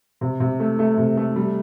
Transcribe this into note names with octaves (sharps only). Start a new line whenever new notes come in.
C3
C3
A3
A3
C3
A3
G3